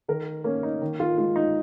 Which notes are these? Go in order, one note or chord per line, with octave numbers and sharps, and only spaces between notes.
D#3 A#4
A#3 C#4
D#4
D#3
F4
G#3 F4
D#4